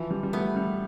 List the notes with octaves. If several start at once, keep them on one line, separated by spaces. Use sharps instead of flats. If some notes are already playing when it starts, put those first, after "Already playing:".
Already playing: E3 F3
G3
G3
A3 B3
G3